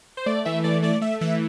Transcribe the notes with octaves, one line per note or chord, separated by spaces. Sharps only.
C5
A3 D5
E3 E5
A3 D5
A3 D5
A3 E5
E3 E5